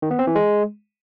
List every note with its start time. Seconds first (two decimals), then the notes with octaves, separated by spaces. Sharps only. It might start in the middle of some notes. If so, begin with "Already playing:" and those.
0.02 D#3
0.11 B3
0.19 C4
0.27 E3
0.35 G#3